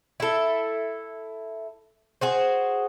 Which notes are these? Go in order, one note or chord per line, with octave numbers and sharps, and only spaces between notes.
E4 A4
F#4 G#4 C5